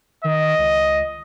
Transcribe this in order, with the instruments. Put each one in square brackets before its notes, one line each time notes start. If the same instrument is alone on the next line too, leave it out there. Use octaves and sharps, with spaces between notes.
[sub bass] D#3 [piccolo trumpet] D#5
[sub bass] C#2